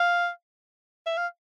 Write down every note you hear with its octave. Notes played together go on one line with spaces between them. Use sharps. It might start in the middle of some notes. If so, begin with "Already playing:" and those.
Already playing: F5
E5
F5